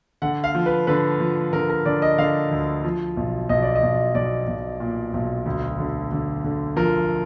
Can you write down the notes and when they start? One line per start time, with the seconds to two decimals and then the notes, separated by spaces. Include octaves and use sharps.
0.22 D3 F#5
0.44 F5
0.55 F3
0.66 B4
0.87 D3 B4
1.20 F3
1.53 D3 A#4
1.70 A#4
1.85 D3 D5
2.02 D#5
2.18 D3 F5
2.51 D2
2.84 F3
3.17 B1
3.49 B1 D#5
3.63 D5
3.75 D#5
3.83 B1
4.14 B1 D5
4.47 B1
4.80 A#2
5.13 B1
5.46 D2
5.79 D3
6.12 D3
6.44 D3
6.76 F3 A#4